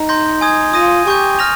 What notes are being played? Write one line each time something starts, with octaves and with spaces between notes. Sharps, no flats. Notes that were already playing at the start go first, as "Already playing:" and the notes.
Already playing: D#4
C6 G6 A#6
G#5 D#6 G#6
F4 D#6 A#6 D#7
G4 G#5 C#6 G6
F6 A#6 F7